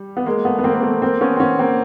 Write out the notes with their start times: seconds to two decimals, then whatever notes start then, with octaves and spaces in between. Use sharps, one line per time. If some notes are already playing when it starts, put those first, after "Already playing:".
Already playing: G3
0.17 B3
0.26 G#3 A#3
0.45 A3 B3
0.59 B3
0.64 A#3 C4
0.75 A#3
0.83 A3 B3
1.02 A#3 C4
1.21 B3 C#4
1.36 C4
1.40 B3 C#4
1.59 A#3 C4